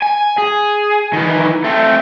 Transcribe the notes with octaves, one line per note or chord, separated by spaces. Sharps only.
G#5
G#4
D#3 E3
A3 C4